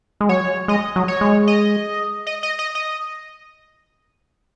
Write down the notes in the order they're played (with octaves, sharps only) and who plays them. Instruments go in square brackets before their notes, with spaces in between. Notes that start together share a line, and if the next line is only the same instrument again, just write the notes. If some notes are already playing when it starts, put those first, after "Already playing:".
[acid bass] G#3
[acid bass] F#3 [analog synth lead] C#5
[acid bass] G#3 [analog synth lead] D#5
[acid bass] F#3
[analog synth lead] C#5
[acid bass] G#3
[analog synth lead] D#5
D#5
D#5
D#5
D#5